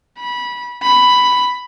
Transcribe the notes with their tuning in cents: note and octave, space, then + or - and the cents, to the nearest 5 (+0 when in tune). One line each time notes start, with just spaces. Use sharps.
B5 -20
B5 +5